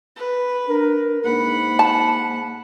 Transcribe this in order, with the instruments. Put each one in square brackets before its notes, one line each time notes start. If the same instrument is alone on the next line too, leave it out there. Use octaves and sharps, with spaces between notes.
[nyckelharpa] B4
[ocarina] D4 [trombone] A#4
[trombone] G#2 [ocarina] A#3 [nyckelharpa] F#5 B5
[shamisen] A5